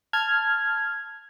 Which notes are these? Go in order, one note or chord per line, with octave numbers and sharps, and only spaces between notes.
A5 F6 G#6